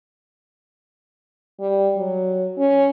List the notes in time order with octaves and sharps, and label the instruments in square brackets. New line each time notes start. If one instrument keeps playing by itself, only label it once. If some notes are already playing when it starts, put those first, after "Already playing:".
[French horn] G3
F#3
C#4